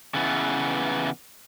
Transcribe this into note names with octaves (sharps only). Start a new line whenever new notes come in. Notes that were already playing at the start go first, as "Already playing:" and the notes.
C#3 E3 B3